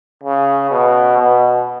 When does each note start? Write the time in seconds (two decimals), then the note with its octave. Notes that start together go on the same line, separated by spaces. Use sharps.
0.24 C#3
0.71 B2
1.18 B2